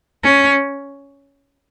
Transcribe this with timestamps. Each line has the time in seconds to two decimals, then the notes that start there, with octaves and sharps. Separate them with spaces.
0.23 C#4